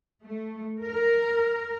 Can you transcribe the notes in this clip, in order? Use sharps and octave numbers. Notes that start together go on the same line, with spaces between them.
A3
A#4